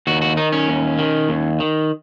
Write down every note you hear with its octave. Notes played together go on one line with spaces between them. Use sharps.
D#2 F#4
F#4
D#3 D#4
C#4
D#2
D#3
D#2
D#3